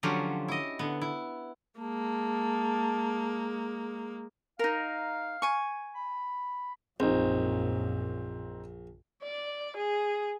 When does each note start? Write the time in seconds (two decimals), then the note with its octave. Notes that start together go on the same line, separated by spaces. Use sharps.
0.03 D3 F3 F#3 C#4 F4 G4
0.48 E4 D#5
0.79 D3 B3
1.01 E4
1.80 G#3 A#3 A5
4.59 D#4 A#4 F5
5.42 G#5 C#6
5.95 B5
7.00 A#1 F#2 A#2 C4 D#4
9.23 D5
9.77 G#4